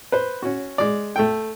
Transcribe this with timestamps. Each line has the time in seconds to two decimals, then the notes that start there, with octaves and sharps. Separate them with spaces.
0.12 B4 C5
0.42 C#4 F#4
0.78 G#3 D5
1.16 A3 A4 G5